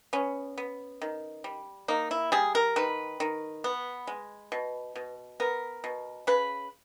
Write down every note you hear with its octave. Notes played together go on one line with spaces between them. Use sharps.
B3 C#4
B3
D#3
G3
A#3 D#4
E4
G3 G#4
A#4
D#3 B4
D#3
B3
G#3
B2
B2
B3 A#4
B2
C#3 B4